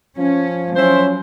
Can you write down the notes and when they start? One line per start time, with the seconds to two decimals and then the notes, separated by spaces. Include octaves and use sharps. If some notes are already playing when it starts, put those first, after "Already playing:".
0.18 F3 C#4
0.76 F#3 C#4 E4 C5